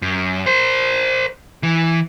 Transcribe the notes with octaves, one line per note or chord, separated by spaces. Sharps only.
F#2
A#4 C5
E3